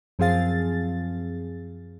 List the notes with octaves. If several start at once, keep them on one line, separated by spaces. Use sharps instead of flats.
F#2 F3 C4 G#4 F5 A6